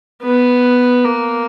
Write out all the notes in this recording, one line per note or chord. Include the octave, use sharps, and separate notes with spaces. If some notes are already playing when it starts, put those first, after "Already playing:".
B3
A#3